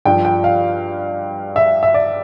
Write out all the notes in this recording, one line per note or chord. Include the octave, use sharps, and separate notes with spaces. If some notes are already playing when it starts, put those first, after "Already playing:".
G2 F3 G5
G5
F5
E5
E5
D5